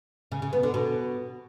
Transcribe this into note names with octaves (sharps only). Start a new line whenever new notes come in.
C#3
C#3
B3
D3
B2